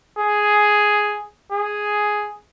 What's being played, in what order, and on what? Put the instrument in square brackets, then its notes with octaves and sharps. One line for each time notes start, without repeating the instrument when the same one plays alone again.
[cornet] G#4
G#4